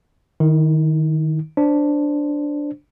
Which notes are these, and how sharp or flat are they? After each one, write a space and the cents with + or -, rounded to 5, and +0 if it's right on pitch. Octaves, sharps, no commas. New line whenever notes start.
D#3 -5 E4 -40
D4 +0 C5 +0